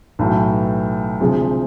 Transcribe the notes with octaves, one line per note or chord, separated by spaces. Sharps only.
B1 A2 E3
D2 C3 F3 G#3